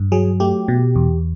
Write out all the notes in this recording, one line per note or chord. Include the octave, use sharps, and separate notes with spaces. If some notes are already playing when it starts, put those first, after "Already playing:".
Already playing: G2
F#3 G#4
A3 G4
B2
E2